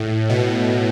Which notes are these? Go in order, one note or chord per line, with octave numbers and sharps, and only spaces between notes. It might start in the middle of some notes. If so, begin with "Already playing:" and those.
Already playing: A2
B2